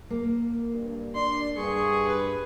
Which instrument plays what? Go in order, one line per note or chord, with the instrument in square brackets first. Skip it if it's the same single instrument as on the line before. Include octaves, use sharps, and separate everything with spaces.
[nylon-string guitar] A#3
[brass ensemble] G2
[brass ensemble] D4 D5 [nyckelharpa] C6
[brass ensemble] G2 [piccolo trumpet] G#4 [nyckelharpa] C#6
[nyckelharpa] B4